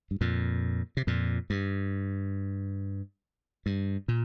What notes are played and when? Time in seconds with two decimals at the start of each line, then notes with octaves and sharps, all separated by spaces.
0.11 G2
0.21 F2 A#2
0.97 C3
1.07 F2 A#2
1.50 G2
3.66 G2
4.08 A#2